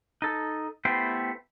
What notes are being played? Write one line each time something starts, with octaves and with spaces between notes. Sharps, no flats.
D#4 A4
A3 B3 E4 G4 C5 G5